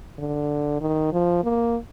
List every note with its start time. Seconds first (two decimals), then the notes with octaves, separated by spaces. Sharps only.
0.19 D3
0.81 D#3
1.13 F3
1.44 A#3